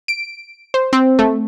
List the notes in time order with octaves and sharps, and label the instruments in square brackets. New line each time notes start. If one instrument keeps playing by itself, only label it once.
[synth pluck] D7
C5
C4
A3